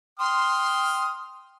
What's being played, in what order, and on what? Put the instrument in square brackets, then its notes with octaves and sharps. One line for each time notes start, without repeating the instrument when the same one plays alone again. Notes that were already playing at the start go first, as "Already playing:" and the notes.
[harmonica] G5 D#6 F6 [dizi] C6